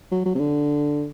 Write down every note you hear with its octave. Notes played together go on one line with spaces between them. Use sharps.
F#3
F#3
C3
D3